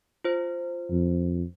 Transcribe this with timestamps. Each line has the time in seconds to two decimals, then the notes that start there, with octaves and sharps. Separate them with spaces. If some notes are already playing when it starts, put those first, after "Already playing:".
0.24 F4 C5
0.91 F2